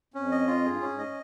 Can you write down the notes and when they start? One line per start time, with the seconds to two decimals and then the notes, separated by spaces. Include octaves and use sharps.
0.14 F2 C#4
0.31 D#5
0.47 F4
0.64 G2 G#4
0.77 G#2
0.81 C#4
0.90 G#2
0.98 D#5